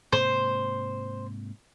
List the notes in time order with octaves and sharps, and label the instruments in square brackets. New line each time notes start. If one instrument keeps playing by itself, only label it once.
[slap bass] G#2 C3 A#3 [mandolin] C5